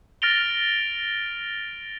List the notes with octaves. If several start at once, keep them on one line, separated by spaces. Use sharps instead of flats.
F6 A6 A#6 D7 F7 G7